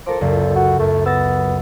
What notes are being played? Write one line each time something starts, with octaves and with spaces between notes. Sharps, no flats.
F3 A4 A#4 D6
C#2 F#2 A#2
F#4
F#2 A3
B3 E6 A6 A#6